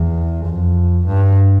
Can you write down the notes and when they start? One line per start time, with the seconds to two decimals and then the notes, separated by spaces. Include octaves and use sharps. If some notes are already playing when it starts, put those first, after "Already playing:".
Already playing: E2
0.46 F2
1.07 G2